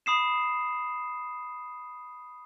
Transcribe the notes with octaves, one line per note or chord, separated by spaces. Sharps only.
B5 D#6 C7 E7